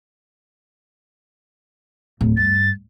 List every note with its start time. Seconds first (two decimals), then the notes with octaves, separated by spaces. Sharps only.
2.21 D1
2.37 G2 A6